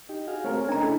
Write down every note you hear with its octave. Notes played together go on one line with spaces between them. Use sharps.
D#4 G4
F#4 G#4 F5
A3 C4 G#4 A#4 C#5
C#3 A3 D4 D#4 A#5
D4 E4 A4